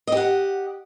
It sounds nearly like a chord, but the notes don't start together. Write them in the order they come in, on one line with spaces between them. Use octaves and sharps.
D#5 G4 F#5